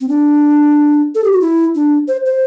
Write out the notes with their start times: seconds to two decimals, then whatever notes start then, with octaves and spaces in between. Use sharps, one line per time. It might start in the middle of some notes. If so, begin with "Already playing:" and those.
0.01 C4
0.09 D4
1.15 A4
1.24 G4
1.32 F#4
1.41 E4
1.75 D4
2.08 C5
2.26 C5